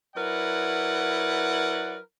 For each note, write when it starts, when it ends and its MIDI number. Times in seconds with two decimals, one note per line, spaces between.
0.16 1.98 54
0.16 1.98 64
0.16 1.98 70
0.16 1.98 71
0.16 1.98 74
0.16 1.98 78